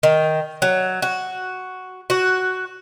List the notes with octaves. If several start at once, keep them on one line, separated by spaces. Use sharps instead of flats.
D#3
F#3
F#4
F#4